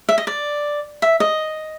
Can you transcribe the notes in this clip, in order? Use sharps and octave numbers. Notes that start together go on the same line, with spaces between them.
E5
D#5
D5
E5
D#5